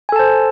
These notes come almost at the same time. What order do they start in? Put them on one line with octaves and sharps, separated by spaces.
G#5 A4 A5 C5